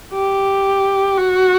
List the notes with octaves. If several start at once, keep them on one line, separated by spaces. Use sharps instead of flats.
G4
F#4